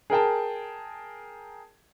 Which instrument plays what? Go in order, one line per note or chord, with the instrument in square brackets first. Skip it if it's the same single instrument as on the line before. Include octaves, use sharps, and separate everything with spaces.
[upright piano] G#4 A#4 G5 A5